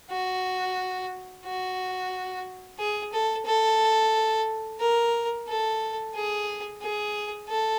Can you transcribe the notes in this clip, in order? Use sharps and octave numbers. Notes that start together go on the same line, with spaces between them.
F#4
F#4
G#4
A4
A4
A#4
A4
G#4
G#4
A4